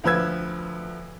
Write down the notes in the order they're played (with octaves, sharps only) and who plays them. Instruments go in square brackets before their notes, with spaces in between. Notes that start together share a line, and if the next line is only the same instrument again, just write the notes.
[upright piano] D2 F3 B4 E6 G#6